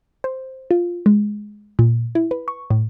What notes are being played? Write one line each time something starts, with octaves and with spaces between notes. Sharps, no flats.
C5
F4
G#3
A#2
E4
B4
C#6
A2